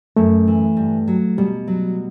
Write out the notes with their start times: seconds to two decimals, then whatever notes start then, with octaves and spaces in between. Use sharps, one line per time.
0.16 F#2 A3
0.47 E3
0.77 G2
1.08 F#3
1.38 B2 G3
1.68 F#3